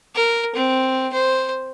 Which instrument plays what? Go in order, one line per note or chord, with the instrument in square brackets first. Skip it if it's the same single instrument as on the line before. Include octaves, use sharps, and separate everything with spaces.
[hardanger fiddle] A#4
C4
C5